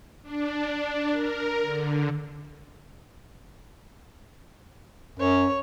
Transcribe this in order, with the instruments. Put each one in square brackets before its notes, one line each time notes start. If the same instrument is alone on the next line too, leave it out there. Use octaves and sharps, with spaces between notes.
[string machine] D4
A#4
D3
[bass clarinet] F#2 [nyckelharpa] C#5